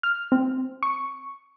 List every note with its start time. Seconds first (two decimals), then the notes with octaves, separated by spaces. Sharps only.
0.03 F6
0.32 C4
0.83 C#6